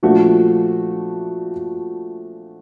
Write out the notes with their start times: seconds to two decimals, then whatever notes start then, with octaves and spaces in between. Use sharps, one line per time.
0.03 A#2 F3 A3 D4 F#4